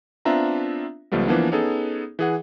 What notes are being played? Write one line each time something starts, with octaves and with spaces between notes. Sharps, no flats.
B3 C4 D4 F4 E5 A#5
C#2 F3 G3 A3 B3
E3 F3 A#3 B3 D4
B3 C#4 D#4 G#4 A4
E3 G#4 F#5